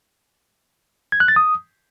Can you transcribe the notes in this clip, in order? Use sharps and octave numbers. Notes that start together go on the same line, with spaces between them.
G#6
F#6
A6
D#6